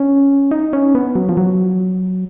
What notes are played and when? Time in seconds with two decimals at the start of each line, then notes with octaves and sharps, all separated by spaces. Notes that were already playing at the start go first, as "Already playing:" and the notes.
Already playing: C#4
0.51 D#4
0.73 C#4
0.95 B3
1.15 F#3
1.29 F3
1.37 F#3